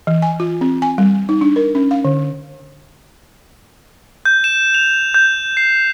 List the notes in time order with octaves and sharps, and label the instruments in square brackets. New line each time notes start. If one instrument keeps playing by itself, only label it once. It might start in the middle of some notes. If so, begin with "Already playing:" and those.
[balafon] E3
G#5
F4
C4
G#5
G3
D#4
D4
A#4
C#4
F5
D3
[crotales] G6
E7
F7
G6
C7